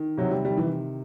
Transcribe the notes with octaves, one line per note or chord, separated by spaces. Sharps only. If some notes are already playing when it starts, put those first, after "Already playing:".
Already playing: D#3
C3 F#3
G3
D#3 G3
E3